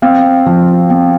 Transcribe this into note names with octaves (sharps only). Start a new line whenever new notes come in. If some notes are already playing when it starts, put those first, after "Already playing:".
C4 F5
F3
C4